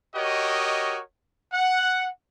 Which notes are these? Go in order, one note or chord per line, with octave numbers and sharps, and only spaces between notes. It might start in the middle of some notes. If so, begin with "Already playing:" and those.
F#4 G4 A#4 C#5 D#5
F#5